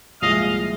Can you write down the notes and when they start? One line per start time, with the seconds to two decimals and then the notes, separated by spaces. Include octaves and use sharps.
0.22 C2 A#2 F3 G#3 D#5 F5